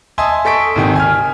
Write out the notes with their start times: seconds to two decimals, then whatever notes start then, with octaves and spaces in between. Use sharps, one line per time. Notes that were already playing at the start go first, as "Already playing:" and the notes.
0.18 D#5 E5 G#5 A5 C6 D#6
0.45 A4 C#6 B6 D7
0.76 G#1 C3 D#3 G5 G#5
0.96 G#5 F6